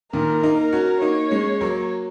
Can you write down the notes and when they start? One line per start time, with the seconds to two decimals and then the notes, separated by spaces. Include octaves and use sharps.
0.13 A#2 D#3 A#4
0.43 A#3 D#4
0.58 A#4
0.73 C#4 F#4
1.01 A#3 D#4 C#5
1.31 G#3 C#4
1.61 F#3 A#3